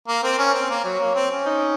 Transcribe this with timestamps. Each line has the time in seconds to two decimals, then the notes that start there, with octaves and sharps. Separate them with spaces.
0.08 A#3
0.23 C4 A#4
0.39 C#4
0.54 C4
0.70 A#3
0.84 F#3 C#5
1.00 A#3
1.15 C4
1.31 C#4
1.46 D#4